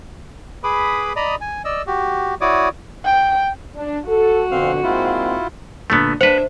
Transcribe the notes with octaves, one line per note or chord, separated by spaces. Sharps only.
G#4 B4 B5 D6 D#6
D5 D#5 A#5 B5 D#6
G#5
D5 D#5 E6
F#4 G4
E4 F#4 C#5 D5 D6 D#6
G5
D4
F#4 A4
F2 B2 D3 C4 F5 F6
G#2 A#3 C4 E4 F4
A#2 D3 A3 B3
D4 B4 C5 E5 F#5